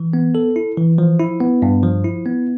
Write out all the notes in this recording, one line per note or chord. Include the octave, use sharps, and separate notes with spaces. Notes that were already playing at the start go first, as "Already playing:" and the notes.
Already playing: E3
B3
A4
E4
E3
F3
E4
B3
G2
F3
E4
B3